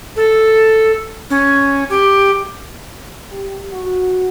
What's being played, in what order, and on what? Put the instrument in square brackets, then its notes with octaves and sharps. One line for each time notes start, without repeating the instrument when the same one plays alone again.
[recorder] A4
C#4
G4
[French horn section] G4
F#4